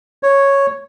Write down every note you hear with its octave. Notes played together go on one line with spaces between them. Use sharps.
C#5